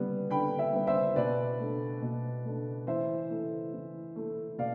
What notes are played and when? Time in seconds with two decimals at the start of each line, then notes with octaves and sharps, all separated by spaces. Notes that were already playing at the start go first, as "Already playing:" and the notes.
Already playing: D3 G3 B3
0.31 D3 G5 B5
0.59 E5 G5
0.73 G3 B3
0.87 C5 E5
1.16 B2 B4 D5
1.59 A3 D4
2.02 B2
2.45 A3 D4
2.87 E3 C5 E5
3.30 A3 E4
3.74 E3
4.16 A3 E4
4.58 B2 D5 F5